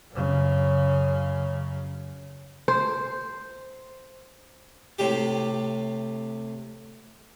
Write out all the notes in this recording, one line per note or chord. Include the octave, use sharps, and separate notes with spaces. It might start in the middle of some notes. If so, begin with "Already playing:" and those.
F#2 C#3
C5
A2 C3 G4